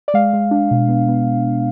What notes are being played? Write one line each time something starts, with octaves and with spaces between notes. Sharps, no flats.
D5
G#3 F5
G#3
D4
B2
B3
B3